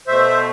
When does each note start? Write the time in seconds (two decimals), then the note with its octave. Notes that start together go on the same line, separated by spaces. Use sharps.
0.07 B2 A3 C5 E5